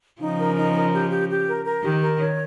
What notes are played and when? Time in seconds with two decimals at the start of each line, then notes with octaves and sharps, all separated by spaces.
0.22 C#3 F3 D#4
0.39 A#4
0.57 D#4
0.75 A#4
0.94 G4
1.11 G4
1.29 G4
1.47 A#4
1.65 A#4
1.83 D#3 G4
2.01 A#4
2.18 C#5